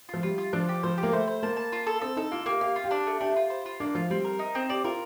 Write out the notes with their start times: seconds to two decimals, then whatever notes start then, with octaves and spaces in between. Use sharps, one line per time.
0.09 F3 F4
0.23 G3 F4
0.38 F4
0.53 F3 D4
0.69 G4
0.83 F3 C5
0.98 G4
1.03 A#3
1.12 A3 C5
1.28 C5
1.43 A#3 A5
1.57 A5
1.72 F4
1.87 A4
2.01 C4 A4
2.17 D#4 A4
2.32 A#3 F4
2.46 A#3 G4
2.61 G4 F5
2.76 F4
2.84 G4
2.91 D4
3.07 A3
3.20 D4 G4
3.36 F4
3.50 C5
3.66 F4
3.80 A#3 D4
3.95 F3 F4
4.10 G3 C4
4.24 A#4
4.39 D#4
4.55 C4
4.69 G4 D5
4.84 F4 A#4